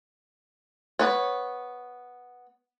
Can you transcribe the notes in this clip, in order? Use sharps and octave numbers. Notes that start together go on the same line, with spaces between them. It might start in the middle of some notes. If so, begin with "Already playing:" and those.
B3 C#5